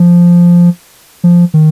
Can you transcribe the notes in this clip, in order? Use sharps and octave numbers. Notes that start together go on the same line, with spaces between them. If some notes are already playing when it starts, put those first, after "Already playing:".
Already playing: F3
F3
D#3